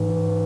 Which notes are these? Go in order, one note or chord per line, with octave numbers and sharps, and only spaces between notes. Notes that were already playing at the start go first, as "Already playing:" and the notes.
Already playing: G#2 E3